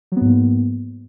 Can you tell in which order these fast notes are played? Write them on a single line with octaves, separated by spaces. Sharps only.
F#3 B3 G#2 A#3